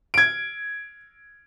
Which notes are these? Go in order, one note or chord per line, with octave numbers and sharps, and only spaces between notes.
G#6 D7